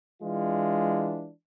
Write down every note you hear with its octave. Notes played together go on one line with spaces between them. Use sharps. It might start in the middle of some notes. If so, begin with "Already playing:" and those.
E3 G#3 D4 F4